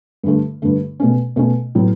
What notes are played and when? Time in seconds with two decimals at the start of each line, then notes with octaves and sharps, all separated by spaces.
0.23 G2 D3 A3
0.62 G2 D3 A3
1.00 B2 A3 C#4
1.36 B2 A3 C#4
1.75 A2 F#3 B3